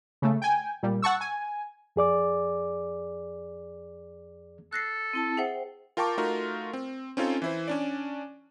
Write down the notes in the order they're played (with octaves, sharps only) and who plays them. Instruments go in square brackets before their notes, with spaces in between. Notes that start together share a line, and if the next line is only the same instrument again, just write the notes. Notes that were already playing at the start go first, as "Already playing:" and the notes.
[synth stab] C#3 A3
G5 G#5
A#2 G3
F#5 A5 C#6 E6
G#5
[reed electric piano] F2 G#4 D5 D6
[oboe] A4 [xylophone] F#6 A#6 C7
[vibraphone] C4 E4 A5
[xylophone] G#4 E5 F#5 [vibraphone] C5 G5
[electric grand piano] F4 A#4 G5 A5 C#6 D6
A3 D#4 F4 F#4 A#4
C4
C4 C#4 D#4 F4 A4 C#5
E3 E4 C5
C#4 D4 D5